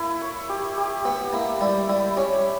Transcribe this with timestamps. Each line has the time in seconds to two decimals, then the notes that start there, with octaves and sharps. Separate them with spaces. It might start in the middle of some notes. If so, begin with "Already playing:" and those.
Already playing: A#3 E4
0.22 C#5
0.49 G4
0.77 G4
1.05 B3 G4
1.33 A#3 E4
1.61 G3 E4
1.89 G3 E4
2.16 C#4 G4